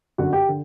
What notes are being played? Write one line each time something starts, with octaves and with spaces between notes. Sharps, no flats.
G1 F#2 D3 F#4 F#5
G4 G5
D3